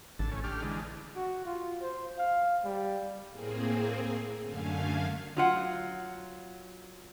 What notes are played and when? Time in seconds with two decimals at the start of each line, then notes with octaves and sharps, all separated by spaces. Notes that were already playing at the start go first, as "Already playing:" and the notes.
0.19 A1 D3 A5
0.32 A2 C#4
0.44 D3 G4 F6
0.62 E3 G#3 D4
1.15 F#4
1.45 F4
1.82 C5
2.18 F5
2.64 G3
3.30 A2 A#3 C4 G#4
4.42 F#2 D3 A3 F5 G#5
5.37 F#3 F4 F#5